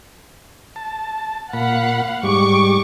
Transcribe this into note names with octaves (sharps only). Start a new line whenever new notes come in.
A5
A#2 F5 F#5 B5
G#2 G3 C#6 D6